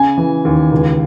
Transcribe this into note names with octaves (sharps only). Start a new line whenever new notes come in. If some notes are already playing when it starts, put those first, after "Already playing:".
Already playing: C#3 G#5
E3
D#2
C#2